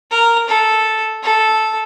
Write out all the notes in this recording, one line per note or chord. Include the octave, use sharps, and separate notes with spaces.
A#4
A4
A4